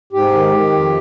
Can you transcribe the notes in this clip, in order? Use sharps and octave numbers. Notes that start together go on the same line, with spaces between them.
G#2 G4
D#3
D#3
F2